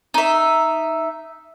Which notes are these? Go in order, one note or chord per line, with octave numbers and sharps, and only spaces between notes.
D#4 E5